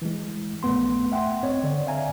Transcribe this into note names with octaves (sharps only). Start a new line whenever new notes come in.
E3 G#3
A#1 A3 B3 C6
E5 F#5 G5 C6
C4 C#5 D#5
D3 D5
D5 E5 F5 G#5 A#5